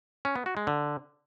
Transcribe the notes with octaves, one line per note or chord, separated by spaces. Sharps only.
C#4
B3
F#4
G#3
D3